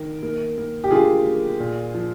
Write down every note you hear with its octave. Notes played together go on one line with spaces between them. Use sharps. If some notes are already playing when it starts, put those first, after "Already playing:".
Already playing: D#3 A#4
A#3
A#3
G4
D3 F4 G#4
A#3
A#2
F3